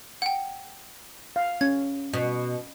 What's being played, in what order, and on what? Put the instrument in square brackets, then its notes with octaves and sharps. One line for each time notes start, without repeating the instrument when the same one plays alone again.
[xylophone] F#5 G5
[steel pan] F5
[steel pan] C#4 [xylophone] G#6
[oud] B2